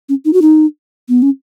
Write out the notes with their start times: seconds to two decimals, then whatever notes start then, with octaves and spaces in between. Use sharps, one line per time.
0.09 C#4
0.25 D#4
0.33 F#4
0.42 D#4
1.09 B3
1.22 C#4